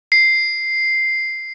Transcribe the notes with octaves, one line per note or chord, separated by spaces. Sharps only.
C7